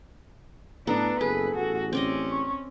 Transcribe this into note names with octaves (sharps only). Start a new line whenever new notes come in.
A2 B3 D4 A4 F#5 A#5
F#1 G#4 A4 B4
A1 F#4
C4 C#4 D5 D#5
C#6